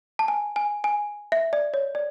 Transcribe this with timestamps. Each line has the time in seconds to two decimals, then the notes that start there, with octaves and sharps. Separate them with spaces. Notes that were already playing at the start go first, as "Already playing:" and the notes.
0.19 A5
0.28 G#5
0.56 G#5
0.84 G#5
1.32 E5
1.53 D5
1.74 C#5
1.95 D5